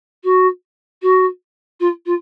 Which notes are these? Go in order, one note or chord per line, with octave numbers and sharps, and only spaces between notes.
F#4
F#4
F4
F4